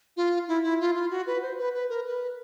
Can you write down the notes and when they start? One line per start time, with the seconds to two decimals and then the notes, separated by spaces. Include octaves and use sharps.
0.17 F4
0.48 E4
0.64 E4
0.80 F4
0.95 F4
1.11 F#4
1.27 B4
1.42 C5
1.58 B4
1.74 B4
1.89 A#4
2.06 B4